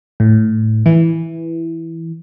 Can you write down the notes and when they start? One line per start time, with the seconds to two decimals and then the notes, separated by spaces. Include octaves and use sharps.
0.20 A2
0.86 E3